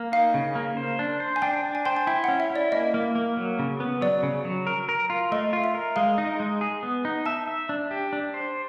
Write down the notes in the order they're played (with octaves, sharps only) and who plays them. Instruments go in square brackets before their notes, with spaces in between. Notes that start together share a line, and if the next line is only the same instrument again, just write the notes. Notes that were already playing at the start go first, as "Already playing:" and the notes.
Already playing: [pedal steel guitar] A#3
[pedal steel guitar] D#4 [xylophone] F5
[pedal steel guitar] C#3
A#3
C5
D4
C5
[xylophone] G#5
[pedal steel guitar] D4 [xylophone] G5
[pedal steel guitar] D4
[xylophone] G#5
[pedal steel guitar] C5 [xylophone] G5
[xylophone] G#5
[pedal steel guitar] E4 [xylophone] G5
[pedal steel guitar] C#4 [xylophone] F#5
[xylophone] E5
[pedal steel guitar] E4
[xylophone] D5
[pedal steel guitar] A#3 [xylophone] D#5
[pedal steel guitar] A#3
A#3
F#3
C#3
B3
[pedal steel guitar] F#3 [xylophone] D5
[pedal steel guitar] C#3
F#3
A#4
A#4
F4
[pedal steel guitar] A3 [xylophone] D#5
[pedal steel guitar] F4
[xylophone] E5
[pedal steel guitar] A#4
[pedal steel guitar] G#3 [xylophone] F5
[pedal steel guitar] D#4
G#3
G#4
B3
D#4
[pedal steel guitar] E5 [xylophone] A5
[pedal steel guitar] E5
D4
G4
D4
C5